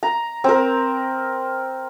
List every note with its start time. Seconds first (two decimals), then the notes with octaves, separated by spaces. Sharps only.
0.03 A#5
0.44 C4 A#4